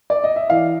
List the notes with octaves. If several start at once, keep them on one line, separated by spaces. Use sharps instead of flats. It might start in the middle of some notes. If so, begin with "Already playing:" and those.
D5
D#5
E5
E3 F5